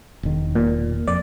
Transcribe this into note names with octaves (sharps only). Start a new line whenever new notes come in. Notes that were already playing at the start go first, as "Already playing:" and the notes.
E1 D#3
A#2
F2 D5